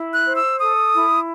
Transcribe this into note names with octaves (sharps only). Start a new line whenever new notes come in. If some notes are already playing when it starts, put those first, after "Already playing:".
Already playing: E4
F#6
C5
E6
A4 D#6
E4